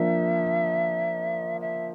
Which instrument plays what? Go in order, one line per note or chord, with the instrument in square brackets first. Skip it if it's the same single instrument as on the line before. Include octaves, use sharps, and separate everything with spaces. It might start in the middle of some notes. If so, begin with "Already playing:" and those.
Already playing: [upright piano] F3 A#3 D4 [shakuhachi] E5
[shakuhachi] E5